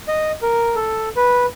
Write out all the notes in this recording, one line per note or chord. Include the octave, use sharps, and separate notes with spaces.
D#5
A#4
A4
B4